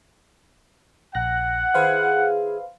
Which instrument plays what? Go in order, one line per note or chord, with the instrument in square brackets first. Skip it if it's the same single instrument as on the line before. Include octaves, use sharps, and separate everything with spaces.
[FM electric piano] A#1 F#6 A#6 [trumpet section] F#5
[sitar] D#3 E4 G#4 [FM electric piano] B4 C5 F5